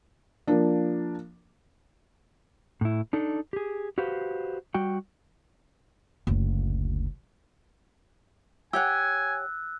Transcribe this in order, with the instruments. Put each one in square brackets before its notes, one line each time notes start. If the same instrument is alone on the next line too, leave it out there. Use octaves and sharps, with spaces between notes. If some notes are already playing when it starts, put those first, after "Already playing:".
[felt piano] F3 A#3 D4
[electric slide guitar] A2 E4
D4 D#4 A4
G4 G#4
F#4 G4 B4 C5 F5
G3 F#4 G5
[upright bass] F#1 D2
[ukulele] G4 C#5 F#5 [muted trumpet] G#5 [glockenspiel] E6 F#6